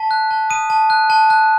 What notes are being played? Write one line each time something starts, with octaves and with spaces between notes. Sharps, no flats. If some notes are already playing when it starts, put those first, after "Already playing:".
Already playing: A5 B6
F#6
A5
D#6 D#7
A5
F#6
A5
F#6